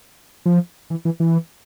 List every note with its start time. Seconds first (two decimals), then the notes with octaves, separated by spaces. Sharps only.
0.46 F3
0.90 E3
1.05 E3
1.20 E3